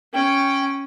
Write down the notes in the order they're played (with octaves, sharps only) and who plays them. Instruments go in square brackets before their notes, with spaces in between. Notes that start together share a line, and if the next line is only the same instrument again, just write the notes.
[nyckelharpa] C#4 [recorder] G5